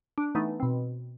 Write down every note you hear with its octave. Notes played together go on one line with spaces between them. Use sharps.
D4
E3 A3 B3 D#4
B2 C4